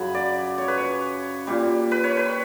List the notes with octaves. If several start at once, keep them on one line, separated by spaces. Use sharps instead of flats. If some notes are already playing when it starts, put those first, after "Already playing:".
Already playing: F#2 C#3 F#3 B5
D5
C#5
B4
C#5
A#2 G3
B4
C#5
B4